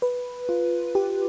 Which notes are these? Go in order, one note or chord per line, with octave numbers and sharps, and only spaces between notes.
B4
F4
G4